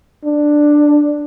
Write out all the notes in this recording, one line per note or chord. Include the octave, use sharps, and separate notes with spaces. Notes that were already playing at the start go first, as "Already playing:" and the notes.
D4